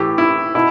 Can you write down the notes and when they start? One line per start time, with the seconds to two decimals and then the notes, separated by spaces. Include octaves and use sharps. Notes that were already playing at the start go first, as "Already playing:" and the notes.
Already playing: A2 E3 G4
0.18 E4
0.55 B2 E4